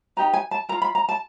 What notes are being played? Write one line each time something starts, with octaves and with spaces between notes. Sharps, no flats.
D#4 G4 B4 A#5
G#5
A5
A#4 A#5
F4
B5
A#5
A5